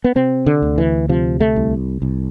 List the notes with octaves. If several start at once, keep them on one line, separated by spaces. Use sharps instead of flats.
B3
C3 C4
D3
D2
E3
C3 F3
A3
C2
C2